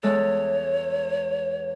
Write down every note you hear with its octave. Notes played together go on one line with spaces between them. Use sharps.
E2 G#3 A4 C#5